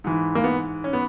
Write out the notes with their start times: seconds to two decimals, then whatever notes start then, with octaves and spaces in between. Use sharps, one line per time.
0.04 G#2 E3
0.35 A#3
0.44 B3
0.84 C#4
0.93 B3